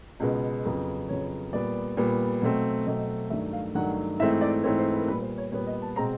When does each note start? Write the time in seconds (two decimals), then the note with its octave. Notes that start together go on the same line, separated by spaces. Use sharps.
0.20 C#2 B2 G#3 B3
0.65 F2 C#3 F#3 B3
1.09 F2 C#3 F#3 B3 C#5
1.53 A#2 G3 B3 D5
1.97 A#2 G3 B3
2.42 B2 F#3 A3 C4
2.86 B2 F#3 A3 C4 D#5
3.30 G2 D#3 F#3 A3 E5
3.53 F5
3.74 G2 D#3 F#3 A3 F#5
4.19 G#2 E3 A3 C4 E5
4.41 D5
4.63 G#2 E3 A3 C4 C#5
4.78 C5
4.93 B4
5.01 A#4
5.08 A#2 G3 B3 B4
5.22 C5
5.38 C#5
5.52 A#2 G3 B3 C#5
5.67 D#5
5.82 A5
5.96 B2 G#3 C4 A#5